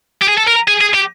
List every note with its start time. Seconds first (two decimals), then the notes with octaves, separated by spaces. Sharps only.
0.22 G4
0.29 G#4
0.38 A4
0.47 A#4
0.68 G#4
0.81 G#4
0.94 G4